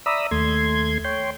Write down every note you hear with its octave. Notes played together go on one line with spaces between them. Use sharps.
D5 E5 A#5 B5 D#6 E6
D#2 A3 C6 G#6
C#5 G5 C6